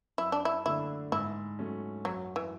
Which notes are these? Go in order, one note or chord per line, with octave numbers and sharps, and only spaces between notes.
F#2 E4
D4
E4
D3 A3 D4 E4
G#2 E4
F#3 A3 C#4
F#2 F#3
E3